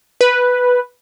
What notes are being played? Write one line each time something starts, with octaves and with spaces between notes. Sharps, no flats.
B4